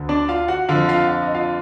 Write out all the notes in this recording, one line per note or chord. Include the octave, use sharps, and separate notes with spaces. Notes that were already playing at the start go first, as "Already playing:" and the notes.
Already playing: D2 D3
D4 D5
F4 F5
F#4 F#5
F2 D3 F4 F5
F4 F5
F5
D#5
F4 F5